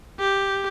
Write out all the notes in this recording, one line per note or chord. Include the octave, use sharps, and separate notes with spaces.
G4